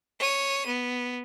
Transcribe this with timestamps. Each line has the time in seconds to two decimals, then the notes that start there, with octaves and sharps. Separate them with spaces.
0.20 C#5 D#7
0.66 B3